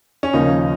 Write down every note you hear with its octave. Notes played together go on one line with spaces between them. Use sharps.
C#4
D#2 C#3 F3 A#3 C#4 D#4